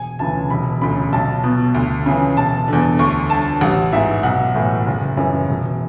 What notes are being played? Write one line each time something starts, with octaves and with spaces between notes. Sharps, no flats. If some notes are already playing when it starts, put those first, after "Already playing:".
Already playing: E1 G#5
D2 C#3 E3 A5
E1 B5
D2 C#3 B5
B1 A5
B2
D2
C#3 E3
E1 A5
E2 D3
D2 C#6
D3 A5
A1 F#5
G#2 E3 E5
B1 F#5
A2 E3
F#1
F#2 C#3 E3
E1